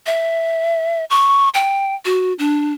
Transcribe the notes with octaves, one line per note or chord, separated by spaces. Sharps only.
E5
C#6
G5
F#4
D4